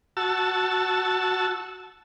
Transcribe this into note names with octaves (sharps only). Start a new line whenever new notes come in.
F#4 A5 E6